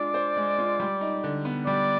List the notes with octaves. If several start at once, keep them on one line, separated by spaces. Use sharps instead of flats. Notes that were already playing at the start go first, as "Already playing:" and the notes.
Already playing: G#3 D4 F4 D5
C5
G#3
F4
G3
D#4
D3
B3
G3 D5